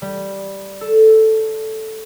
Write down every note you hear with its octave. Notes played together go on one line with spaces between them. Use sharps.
G3
A4